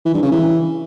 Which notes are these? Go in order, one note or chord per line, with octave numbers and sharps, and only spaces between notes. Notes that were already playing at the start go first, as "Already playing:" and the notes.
E3
G2
C#3
E3